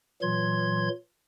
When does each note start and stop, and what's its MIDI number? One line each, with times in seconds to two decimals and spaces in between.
0.22 0.89 46
0.22 0.89 52
0.22 0.89 54
0.22 0.89 84
0.22 0.89 92